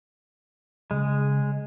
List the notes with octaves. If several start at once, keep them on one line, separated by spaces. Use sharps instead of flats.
C#3 G#3